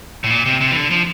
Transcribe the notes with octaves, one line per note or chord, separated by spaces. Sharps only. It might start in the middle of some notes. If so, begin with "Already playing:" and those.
A2
A#2
C3
C3
E3
D3
F3